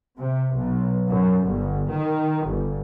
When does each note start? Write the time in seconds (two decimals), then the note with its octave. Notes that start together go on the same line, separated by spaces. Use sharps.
0.18 C3
0.56 B1
1.09 F#2
1.45 G1
1.91 D#3
2.47 G1